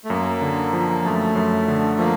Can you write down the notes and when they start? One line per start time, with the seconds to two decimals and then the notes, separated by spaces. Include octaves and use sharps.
0.05 A3
0.09 F#2 A#3
0.41 D3
0.73 F3
1.05 F#2 A3
1.36 F#2
1.68 D3
1.99 F3 A#3